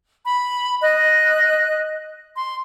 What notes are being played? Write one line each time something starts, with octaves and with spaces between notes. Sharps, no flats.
B5
D#5 F#6
C6